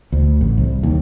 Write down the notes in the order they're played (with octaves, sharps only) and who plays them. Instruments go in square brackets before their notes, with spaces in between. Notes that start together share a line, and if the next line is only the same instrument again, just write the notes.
[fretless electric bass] D2
A1
C2
D#2